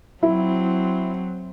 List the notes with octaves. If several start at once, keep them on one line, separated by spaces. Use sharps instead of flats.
F#3 C4 E4